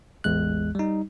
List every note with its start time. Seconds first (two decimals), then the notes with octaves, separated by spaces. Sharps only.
0.24 A1 E2 G#3 F#6
0.75 G3 D#4